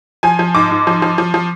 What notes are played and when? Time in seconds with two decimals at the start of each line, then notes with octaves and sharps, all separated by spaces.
0.23 F3 G#5
0.39 F3
0.55 G#2 D6
0.71 G#2
0.87 F3
1.02 F3
1.18 F3
1.34 F3